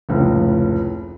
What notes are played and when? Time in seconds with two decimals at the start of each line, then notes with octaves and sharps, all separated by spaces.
0.09 F1 C#2 A2